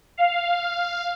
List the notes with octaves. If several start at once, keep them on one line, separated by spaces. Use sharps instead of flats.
F5